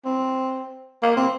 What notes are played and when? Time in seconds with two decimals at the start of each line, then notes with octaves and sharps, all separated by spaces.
0.05 C4
1.03 A#3
1.17 C4